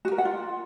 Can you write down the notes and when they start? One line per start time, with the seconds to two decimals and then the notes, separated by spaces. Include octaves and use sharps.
0.05 F#4
0.12 A#4
0.18 F#5
0.25 F4